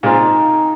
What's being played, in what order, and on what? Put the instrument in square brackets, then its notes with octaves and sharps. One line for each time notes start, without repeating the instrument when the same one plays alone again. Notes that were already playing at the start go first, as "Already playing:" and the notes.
[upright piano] A#2 G#3 C4 F4 [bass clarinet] D#4